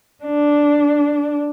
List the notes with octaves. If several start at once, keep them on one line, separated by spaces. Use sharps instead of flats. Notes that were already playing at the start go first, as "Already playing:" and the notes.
D4